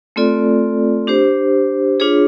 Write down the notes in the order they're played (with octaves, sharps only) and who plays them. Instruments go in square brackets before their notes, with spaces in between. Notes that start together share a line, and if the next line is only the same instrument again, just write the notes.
[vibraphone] A3 C4 F4 A4 D5
D4 G4 C5
D4 F4 G#4 C#5